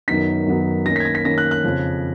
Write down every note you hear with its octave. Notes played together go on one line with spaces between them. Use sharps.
F#2 D#3 F#3 B3 D#4 B6
F#2 D#3 F#3 B3 D#4
D#3 A#3 C#4 A#6
B6
G#6
A#6
B6
D#3 A#3 C#4 A#6
F#6
F#6
F2 C#3 F3